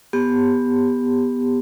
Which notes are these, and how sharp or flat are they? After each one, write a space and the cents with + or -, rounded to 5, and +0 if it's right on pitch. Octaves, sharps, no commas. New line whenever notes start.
B3 +0 G4 +20